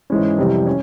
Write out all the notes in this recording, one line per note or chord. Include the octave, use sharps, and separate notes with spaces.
G#2 E3 G#3 C#4
F2 C3 E3 G3
C#4